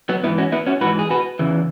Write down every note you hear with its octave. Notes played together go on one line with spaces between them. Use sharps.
F#3 B3
G#2 E3 B3 E4
C#4 F#4
B3 E4
C#4 F#4
G#2 E3 F#4 B4
G#4
F#4 B4
E2 C#3 E3